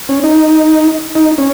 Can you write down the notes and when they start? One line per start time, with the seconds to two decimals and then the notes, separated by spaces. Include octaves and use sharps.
0.09 C#4
0.24 D#4
1.15 D#4
1.38 C#4